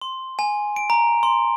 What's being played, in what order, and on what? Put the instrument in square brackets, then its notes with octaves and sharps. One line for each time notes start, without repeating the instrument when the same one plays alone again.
[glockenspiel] C6
G#5
D7
A#5
C6